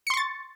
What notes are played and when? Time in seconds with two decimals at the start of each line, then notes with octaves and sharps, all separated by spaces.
0.07 C#7
0.10 C6
0.14 C#6
0.17 A6